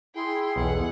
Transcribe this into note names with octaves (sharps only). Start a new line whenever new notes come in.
E4 G#4 G5 C6
B1 E2 F#5